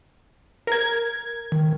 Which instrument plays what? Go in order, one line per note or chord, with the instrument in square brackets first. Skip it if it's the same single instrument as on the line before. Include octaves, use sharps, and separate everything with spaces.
[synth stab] A#4 G#6
[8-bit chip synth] D#3